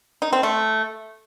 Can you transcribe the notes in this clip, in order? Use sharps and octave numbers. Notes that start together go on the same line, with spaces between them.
D#4
C4
A3